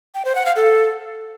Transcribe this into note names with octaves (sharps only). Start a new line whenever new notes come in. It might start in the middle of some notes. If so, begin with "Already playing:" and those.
G5
C5
F#5
F5
A4